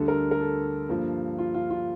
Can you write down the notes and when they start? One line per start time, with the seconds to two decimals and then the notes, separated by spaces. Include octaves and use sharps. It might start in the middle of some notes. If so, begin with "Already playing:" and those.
Already playing: D2 D3 G3 A4
0.08 A#4
0.31 A#4
0.41 A4
0.89 G2 F3 A#3
1.38 F4
1.54 F4
1.70 F4